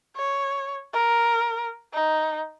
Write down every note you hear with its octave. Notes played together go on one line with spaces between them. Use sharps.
C#5
A#4
D#4